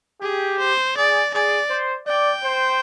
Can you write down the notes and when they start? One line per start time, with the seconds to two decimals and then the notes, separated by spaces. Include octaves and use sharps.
0.22 G4 G#4
0.59 C5
0.96 G#4 D5
1.34 G#4 D5
1.70 C5
2.07 D5 G5
2.44 C5